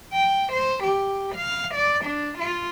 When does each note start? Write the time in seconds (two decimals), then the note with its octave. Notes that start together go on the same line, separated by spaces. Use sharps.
0.13 G5
0.53 C5
0.84 G4
1.36 F5
1.74 D5
2.05 D4
2.39 F4